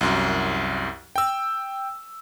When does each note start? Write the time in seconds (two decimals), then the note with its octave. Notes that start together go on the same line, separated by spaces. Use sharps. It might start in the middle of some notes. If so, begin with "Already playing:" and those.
0.01 C2 F#2
1.16 G5 E6